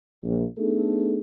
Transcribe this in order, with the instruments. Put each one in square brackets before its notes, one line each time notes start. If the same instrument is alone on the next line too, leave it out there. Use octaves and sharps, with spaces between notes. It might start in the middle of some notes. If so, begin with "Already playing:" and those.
[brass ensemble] A#1
A3 B3 D4 D#4 G#4 A4